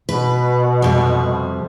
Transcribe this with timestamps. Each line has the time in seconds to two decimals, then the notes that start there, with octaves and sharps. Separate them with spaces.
0.09 B2 B4
0.82 F2 C3 G3